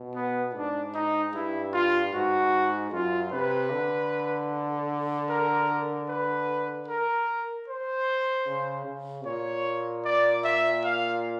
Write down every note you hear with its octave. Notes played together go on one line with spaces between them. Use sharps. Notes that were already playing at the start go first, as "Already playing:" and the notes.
Already playing: B2
B3
G#2 D4
D#4
G2 E4
F4
G#2 F#4
F#2 F4
C3 B4
D3
A#4
B4
A#4
C5
C#3
C#3
A#2 C#5
D5
E5
F5